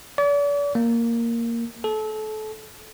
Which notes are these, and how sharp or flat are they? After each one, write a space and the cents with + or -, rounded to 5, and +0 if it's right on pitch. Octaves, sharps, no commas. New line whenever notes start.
D5 -40
A#3 -5
A4 -30